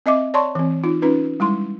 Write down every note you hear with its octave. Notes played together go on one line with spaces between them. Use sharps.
C4 D#5 E5 D6
C#5 D5 A5 C6 C#6
E3 C4
D#4 F4
C#4 D#4 F4 B4
G3 G#3 E4 C6